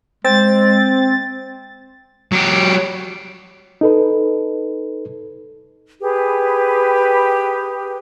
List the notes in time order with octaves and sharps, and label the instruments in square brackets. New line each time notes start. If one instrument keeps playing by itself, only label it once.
[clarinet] G#3 [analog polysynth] C4 A6
[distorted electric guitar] F#3 G4
[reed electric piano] D#4 A4 B4
[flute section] G4 G#4 B4